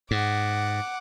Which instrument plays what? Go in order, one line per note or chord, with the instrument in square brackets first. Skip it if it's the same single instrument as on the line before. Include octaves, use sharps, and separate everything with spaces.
[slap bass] G#2 [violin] F#5 D6